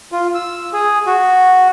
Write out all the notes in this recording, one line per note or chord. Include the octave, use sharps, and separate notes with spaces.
F4
E6
G#4
F#4